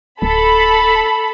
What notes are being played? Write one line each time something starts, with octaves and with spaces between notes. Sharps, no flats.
D1 A4 B5